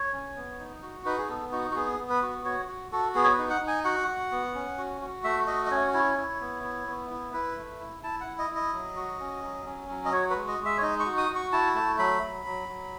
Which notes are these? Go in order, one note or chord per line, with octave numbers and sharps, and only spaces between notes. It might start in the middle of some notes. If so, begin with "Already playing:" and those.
Already playing: C#5
C#4
B3
D#4
F#4
D#4 B4
G#4
B3 A4
D#4 F#4
F#4
B3 G#4
B3
B4
F#4
F#4 C#5
F#4
F#4 A4
B3 G#4
C#5
B4
D#4
F#5
D#4
G#5
F#4 F#5
F#4
B3
C#4
F#4
F#4
A3 E5
F#4 D#5
D#5
C#4 C#5
E4 C#5
E4
B3
E4
B3
E4
E4 B4
A3
E4
E4 A5
F#5
E4
D#5
E4
D#5
F#3
F#4
C#4
F#3
C#4
F#3
D#5
F#4 C#5
B4
G#3
D#5
G#3
E5
C#5
D#4 D#5
C#6
F#4
D#6
F#4
C#6
E4 A5
A3 A5
F#3 B5
F#3
F#3
F#3